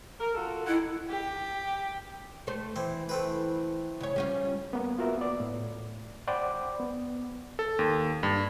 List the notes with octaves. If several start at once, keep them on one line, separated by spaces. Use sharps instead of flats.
A#4
F4 F#4 A4
D#3 E4 F#5
G4
A3 C5
E3 C4
A3 C4 B4
C#3 C#5
G3 C#4 F4
A#3 B3
F4 F#4 A#4 E5
B3 D5
A2
C5 D5 F#5 G5 B5 D6
B3
A4
D#2
G2